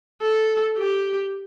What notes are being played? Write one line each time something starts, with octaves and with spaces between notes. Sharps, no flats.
A4
G4